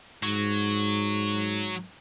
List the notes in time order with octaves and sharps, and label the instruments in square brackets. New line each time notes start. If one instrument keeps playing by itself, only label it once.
[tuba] G#2 [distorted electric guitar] F#3